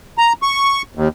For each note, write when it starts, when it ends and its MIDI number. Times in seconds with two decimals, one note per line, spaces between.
0.18 0.33 82
0.43 0.82 85
0.95 1.08 39